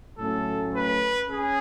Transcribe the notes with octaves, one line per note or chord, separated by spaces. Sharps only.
A2 F#3 A3 C#4 A4
B4
C#4 G#4